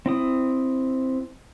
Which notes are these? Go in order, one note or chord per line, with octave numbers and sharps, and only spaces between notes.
C4 E4 D#6